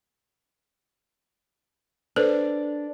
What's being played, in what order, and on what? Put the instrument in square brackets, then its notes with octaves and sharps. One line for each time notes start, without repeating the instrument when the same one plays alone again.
[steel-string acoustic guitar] D4 [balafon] A4 B4 C5